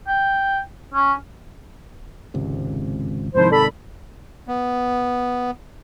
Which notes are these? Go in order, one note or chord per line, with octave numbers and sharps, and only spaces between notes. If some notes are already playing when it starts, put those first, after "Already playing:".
G5
C#4
G#1 C#2 C3
G#2 C3 D#3 F3 E4 C5
A4 D5 B5
B3